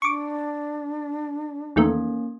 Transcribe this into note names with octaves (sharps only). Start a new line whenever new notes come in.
D4 C#6 D6
E2 D#3 A3 A#3 C#4